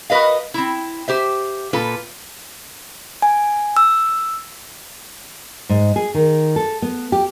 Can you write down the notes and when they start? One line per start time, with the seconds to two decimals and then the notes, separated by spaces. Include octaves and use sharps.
0.10 F#4 A#4 B4 D#5 F5
0.54 C4 E4
1.08 G4 C5 E5
1.73 A#2 F4 A4 B4
3.22 G#5
3.77 E6
5.69 G#2
5.96 G#4
6.14 D#3
6.56 A4
6.82 B3
7.12 G4